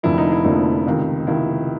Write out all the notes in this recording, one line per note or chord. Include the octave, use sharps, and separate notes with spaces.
F1 F2 D3 F3 A#3 E4
D#4
E4
F1 F2 D3 F3 A#3 D#4
C#2 C3 D#3
C#2 C3 D#3 E4